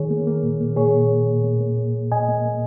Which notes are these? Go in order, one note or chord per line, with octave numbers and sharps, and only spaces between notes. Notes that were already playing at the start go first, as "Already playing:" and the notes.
Already playing: D#3 G#4 C#5
A#3
A#3
A#2
A#3
A#2 G#4 C#5
A#3
A#2
A#2
A#3
A#3
A#2
A#2
A#2 D#5 G#5
A#3
A#3